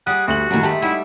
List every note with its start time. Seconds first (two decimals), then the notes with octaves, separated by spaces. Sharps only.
0.07 G3 G#4 F#5 D#6
0.28 D2 F#4 F#7
0.51 F#2 A2 D#3 F#3
0.63 G#3 A3 G4 A5 B5
0.82 G3 D#4 E4 E5 F#5